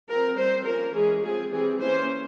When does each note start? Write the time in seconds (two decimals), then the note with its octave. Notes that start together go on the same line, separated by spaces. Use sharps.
0.08 F3 C4 A#4
0.37 G3 C4 C5
0.65 F3 A#3 C#4 A#4
0.94 E3 G#3 C#4 G#4
1.22 F3 C4 G#4
1.51 E3 G3 C4 G#4
1.80 E3 A#3 C#4 C5